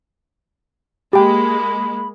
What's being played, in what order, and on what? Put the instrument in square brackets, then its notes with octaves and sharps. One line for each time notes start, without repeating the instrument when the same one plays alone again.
[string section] G#3 A#3 [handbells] G4 G5 [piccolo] B5